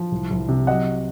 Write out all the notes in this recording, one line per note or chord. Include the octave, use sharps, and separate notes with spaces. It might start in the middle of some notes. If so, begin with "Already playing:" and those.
Already playing: F3
C2
C2
C3
F#3 D#5 F#5